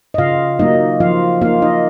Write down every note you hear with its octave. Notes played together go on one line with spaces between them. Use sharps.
D#5
C#3 F4 F5
F#3 A#3 D#4 D#5
F3 F4 F5
A#3 D#4 F4 F5
D#4 D#5